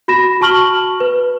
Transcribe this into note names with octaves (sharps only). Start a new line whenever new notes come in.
F#4 B5 A#6 E7
F#4 A5 C#6 F6 F#7 G7
B4